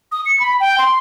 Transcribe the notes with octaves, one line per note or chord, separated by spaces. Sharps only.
D#6
C#7
B5
G5
C6